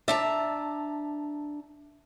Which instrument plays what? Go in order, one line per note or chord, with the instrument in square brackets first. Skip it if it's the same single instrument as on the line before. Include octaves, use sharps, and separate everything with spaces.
[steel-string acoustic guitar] D4 A5 A#5 [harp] E5